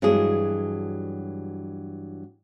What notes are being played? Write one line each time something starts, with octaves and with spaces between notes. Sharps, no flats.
G2 E3 F#3 G#3 F#4 G#4